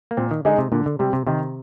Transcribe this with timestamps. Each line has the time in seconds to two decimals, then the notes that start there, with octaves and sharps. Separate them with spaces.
0.11 A#3
0.17 A#2 C4
0.31 D#3
0.45 D3 G#3 D#4 G#4
0.58 C3
0.72 A#2 D3
0.86 D3
0.99 C3 G3 C4
1.13 C3
1.27 C3 D#3